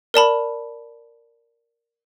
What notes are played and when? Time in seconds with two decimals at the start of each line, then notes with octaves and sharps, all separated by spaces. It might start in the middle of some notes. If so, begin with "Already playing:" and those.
0.14 A#4 D5 A5 B5